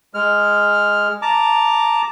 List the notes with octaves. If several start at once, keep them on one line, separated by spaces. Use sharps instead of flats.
G#3 F6
A5 A#5 D6